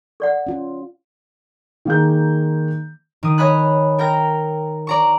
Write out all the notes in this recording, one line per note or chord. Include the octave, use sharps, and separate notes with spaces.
A4 D5 F#5
C#4 F4
D#3 A#3 G#4 G6
D#3 D#6
C#5 D#5 G#5 B5 F#6
A#4 G5 F6 A#6
D5 A#5 C#6